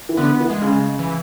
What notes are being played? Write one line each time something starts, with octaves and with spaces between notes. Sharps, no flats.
E3
D3 B3
E3
G#3
C#3
E3